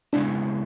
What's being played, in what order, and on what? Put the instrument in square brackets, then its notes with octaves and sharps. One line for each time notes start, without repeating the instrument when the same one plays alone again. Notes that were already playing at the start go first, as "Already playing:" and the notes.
[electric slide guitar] C#3 G#3 B3 E4 [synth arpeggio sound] D4